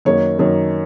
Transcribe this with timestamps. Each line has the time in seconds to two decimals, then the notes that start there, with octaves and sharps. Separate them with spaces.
0.05 F#2 D#3 A#3 C#5
0.38 F#2 D#3 A#3